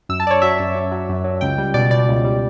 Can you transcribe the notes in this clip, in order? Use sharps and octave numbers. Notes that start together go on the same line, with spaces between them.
F#2 E6
A5
F#2 D5
C#5
F#3 E5
F#2
F#2
F#3
F#2
F#3
C#2 G5
G3
B2 D5
B2 D5
C#2
G3